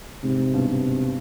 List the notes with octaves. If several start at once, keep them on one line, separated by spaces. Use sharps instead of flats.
G#2 C3
G#2
G2 B2
C3